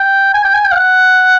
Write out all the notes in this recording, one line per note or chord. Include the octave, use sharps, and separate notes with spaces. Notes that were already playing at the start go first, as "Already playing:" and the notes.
Already playing: G5
G#5
G5
G#5
G5
F5
F#5